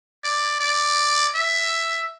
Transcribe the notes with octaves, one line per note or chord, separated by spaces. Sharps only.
D5
D5
E5